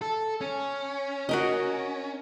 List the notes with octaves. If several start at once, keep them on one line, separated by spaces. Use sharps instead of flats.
A4
C#4
F#4 A#4 D#5